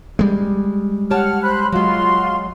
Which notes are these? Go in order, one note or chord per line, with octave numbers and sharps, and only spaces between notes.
G3 G#3
G4 C#5 F#5 A5 F6
C5 B5 F#6
F#3 G#3 F4 F#4 C6